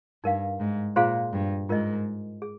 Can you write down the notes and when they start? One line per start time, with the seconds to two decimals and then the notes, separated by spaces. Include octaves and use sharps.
0.23 G2 D#4 A#4 F5
0.60 G#2
0.96 A#2 F4 G#4 C5 F5 C6
1.32 G2
1.69 G#2 F4 A#4 D#5
2.42 G#4